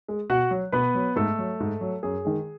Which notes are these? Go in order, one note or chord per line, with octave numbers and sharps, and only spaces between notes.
G#3
B2 F#4 F#5
F#3
B2 B3 B4
F#3
G#2 A3 A4
F#3
G#2
F#3
F#2 G#4
D#3 G#3